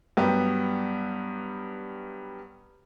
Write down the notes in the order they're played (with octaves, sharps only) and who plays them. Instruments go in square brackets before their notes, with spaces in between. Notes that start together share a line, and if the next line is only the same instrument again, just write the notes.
[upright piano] G2 F#3 G3 B3 G4